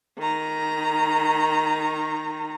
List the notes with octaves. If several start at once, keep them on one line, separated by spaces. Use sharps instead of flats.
D#3 A#5